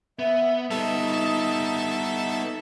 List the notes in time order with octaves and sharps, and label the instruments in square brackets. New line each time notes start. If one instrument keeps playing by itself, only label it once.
[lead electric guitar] B3 [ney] E5
[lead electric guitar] G3 B3 [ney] D#4 [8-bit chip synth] A4 E5 A5
[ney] D#4